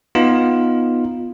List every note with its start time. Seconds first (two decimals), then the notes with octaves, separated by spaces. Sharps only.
0.15 B3 D#4 F4